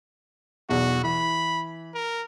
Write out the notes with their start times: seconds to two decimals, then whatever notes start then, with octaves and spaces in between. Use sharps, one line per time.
0.69 B1 E2 B2 F#4
1.04 E3 B5
1.95 A#4